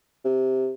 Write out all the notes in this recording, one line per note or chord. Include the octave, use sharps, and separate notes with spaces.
C3